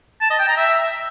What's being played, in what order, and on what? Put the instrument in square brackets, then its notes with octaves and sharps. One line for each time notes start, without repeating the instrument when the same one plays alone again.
[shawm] A5
D#5
G5
A#5
E5